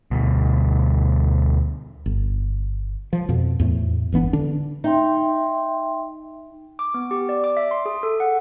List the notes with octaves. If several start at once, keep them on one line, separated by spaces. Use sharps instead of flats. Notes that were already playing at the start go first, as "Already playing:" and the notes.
D2 B2
G1
F3
F2 B2 F3
E2 A2 A3
G1 E3 B3 D4
D3 D4
D#4 E5 G5 C6
D6
B3
G4
D5
D6
E5
C6
G#4
A4
F#5